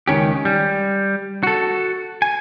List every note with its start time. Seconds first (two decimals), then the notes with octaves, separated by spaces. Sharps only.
0.08 C#2 D#3 C#4 G4
0.45 G3
1.43 F#4 A4
2.22 G#5